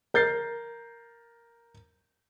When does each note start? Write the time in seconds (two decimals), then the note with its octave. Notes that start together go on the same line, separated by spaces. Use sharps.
0.14 A#4 G6 A6 C7